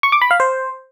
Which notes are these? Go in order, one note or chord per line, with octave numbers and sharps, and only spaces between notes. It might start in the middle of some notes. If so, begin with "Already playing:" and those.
C#6
D6
B5
F5
C5